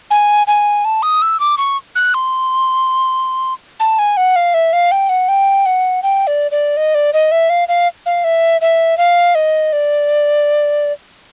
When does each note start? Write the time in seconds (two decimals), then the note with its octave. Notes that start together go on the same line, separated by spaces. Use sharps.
0.11 G#5
0.47 G#5
0.85 A5
1.03 D#6
1.22 E6
1.40 D6
1.58 C#6
1.95 F#6
2.14 C6
3.80 A5
3.99 G#5
4.17 F#5
4.36 F5
4.54 E5
4.73 F5
4.92 G5
5.09 F#5
5.28 G5
5.66 F#5
6.03 G5
6.27 D5
6.51 D5
6.77 D#5
6.95 D5
7.13 D#5
7.32 E5
7.50 F5
7.68 F5
8.06 F5
8.24 E5
8.61 E5
8.98 F5
9.35 D#5
9.73 D5